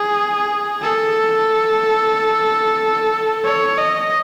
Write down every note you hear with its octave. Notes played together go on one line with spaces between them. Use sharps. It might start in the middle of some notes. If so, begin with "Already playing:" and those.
Already playing: G#4
A4
C#5
D#5